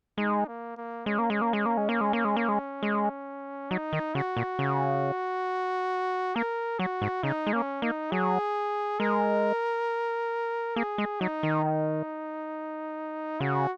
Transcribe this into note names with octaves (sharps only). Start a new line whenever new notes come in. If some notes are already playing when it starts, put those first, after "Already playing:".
G#3 D#4
A#3
A#3
G#3 C#4
A#3
G#3
A#3
G#3
A#3
G#3
A#3
G#3
A#3
G#3
A#3
G#3
G#3
F#3 D#4
D#3
C#3 F#4
A#2
C#3
A#3 A#4
F#3 F#4
G#2
C#3 D#4
G#3
A#3 C#4
A#3 D#4
F#3 G#4
G#3 A#4
A#3 G#4
G#3
F#3 D#4
D#3
D#4
C#3 F#4